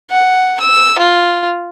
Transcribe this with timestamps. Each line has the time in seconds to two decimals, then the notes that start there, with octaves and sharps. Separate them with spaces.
0.10 F#5
0.60 E6
0.98 F4